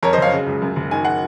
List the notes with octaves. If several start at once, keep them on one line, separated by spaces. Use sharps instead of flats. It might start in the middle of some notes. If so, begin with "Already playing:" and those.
F2 A#4 C#5
C5 D#5
F#1 C#5 F5
C#3
C#2
F#2
F#1
D#3 G#5
F#5